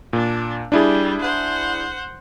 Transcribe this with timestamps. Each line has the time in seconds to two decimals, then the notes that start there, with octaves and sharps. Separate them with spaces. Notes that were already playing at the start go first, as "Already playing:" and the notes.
0.13 A#2 D4
0.72 G3 D4 E4 G#4
1.21 C5 F#5